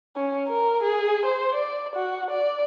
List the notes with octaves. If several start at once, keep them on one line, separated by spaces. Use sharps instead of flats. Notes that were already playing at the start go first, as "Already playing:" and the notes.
C#4
A#4
G#4
C5
D5
F#4
D5